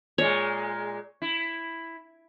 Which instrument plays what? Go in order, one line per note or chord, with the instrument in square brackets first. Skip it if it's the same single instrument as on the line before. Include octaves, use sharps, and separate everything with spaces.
[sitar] A#2 G#3 [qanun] C#5
[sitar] E4